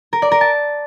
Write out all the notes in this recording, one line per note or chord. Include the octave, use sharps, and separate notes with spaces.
A#4
D5
A#4
A5